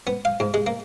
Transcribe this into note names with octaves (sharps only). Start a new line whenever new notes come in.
B3
F5
G#2
G#3
A#3